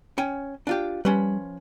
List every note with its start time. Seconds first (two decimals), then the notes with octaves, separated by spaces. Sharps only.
0.18 C#4 G5 G#5
0.67 D4 F4 G4
1.05 F3 G3 C#4 B4